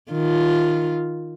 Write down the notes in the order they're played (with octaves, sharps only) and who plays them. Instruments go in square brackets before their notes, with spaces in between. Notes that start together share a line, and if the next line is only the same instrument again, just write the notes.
[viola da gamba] D#3 F4